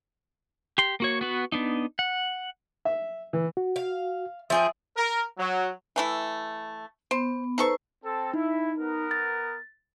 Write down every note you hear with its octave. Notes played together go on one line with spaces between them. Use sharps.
G4 C6
A#3 F#4 C#5
B3 F#4 B4
B3 D4 D#4
F#5
E5
E3
F#4
F5
F3 G#4 E5 G5
A#4
F#3
E3 A3 E4
B3 C5
D#4 A4 B4 C5 C#6 E6
C4 A4
D#4 E4
B3 A#4
A6